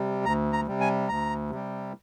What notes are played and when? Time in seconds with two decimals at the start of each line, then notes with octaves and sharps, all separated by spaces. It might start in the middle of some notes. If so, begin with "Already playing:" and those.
Already playing: C3 G3
0.25 D2 A#5
0.52 A#5
0.67 C3 G3
0.80 G#5
1.09 D2 A#5
1.50 C3 G3